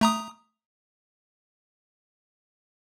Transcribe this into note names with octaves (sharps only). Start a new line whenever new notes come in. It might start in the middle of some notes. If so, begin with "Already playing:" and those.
A3 A#5 D#6